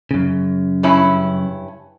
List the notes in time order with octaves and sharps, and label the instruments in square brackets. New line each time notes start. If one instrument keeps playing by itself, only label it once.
[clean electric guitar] F#2 C#3
[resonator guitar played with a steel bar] G2 C#4 E4